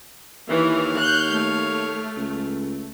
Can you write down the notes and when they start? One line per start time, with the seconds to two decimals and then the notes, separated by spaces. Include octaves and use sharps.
0.50 D#2 E3 C#5 F5
0.99 F#6 G6
1.33 A3
2.17 C#2